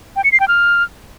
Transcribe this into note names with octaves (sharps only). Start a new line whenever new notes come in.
G5
C#7
C7
G5
F6